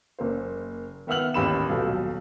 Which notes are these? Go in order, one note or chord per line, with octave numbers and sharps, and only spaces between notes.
F#1 A#3 C5
D#3 B3 E5 F#5 F6 F#7
A1 D#2 B5 E7
D#1 B1 F#3 A4